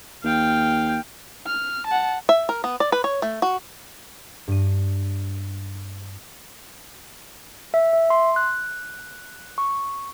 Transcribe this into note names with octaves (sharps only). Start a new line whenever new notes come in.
D#2 F5 G5
F6
F#5 A5
E5
A#4
B3
D5
B4
C#5
A3
F#4
G2 D#7
E5
E5
C6
F#6
C#6